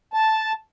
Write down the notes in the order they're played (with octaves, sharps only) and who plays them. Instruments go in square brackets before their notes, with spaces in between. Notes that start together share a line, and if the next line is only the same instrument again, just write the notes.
[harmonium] A5